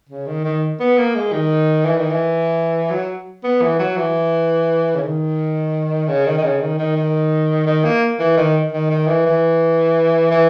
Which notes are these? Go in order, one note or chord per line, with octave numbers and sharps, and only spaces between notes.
C#3
D#3
D#3
B3
A#3
G#3
D#3
E3
D#3
E3
F#3
B3
E3
F#3
E3
C#3
D#3
C#3
D#3
D#3
C#3
D#3
D#3
D#3
D#3
A#3
E3
D#3
D#3
D#3
E3
E3
E3